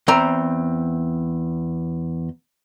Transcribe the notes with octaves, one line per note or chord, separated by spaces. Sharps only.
E2 C4 C5 A#5